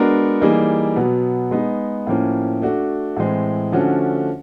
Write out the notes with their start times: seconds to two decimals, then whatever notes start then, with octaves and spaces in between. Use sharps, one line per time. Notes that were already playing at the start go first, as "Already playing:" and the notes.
Already playing: G#3 B3 D4 F#4 A#4
0.41 E3 G3 A#3 D#4 G#4
0.96 B2 F#3 B3
1.51 G#3 B3 D#4 G#4
2.07 A2 F3 A#3 C#4
2.62 A3 D4 F#4
3.17 A2 E3 G#3 C4
3.72 D3 F3 A3 C#4 F#4